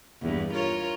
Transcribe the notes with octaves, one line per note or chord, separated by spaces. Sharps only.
E2 G2
F4 A#4 C#5